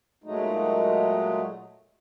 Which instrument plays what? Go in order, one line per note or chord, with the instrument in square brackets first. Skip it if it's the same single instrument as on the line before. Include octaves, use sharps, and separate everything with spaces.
[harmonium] A#2 F#3 G#3 A3 D#4